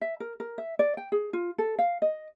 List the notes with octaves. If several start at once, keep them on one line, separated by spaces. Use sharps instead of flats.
E5
A#4
A#4
E5
D5
G5
G#4
F4
A4
F5
D#5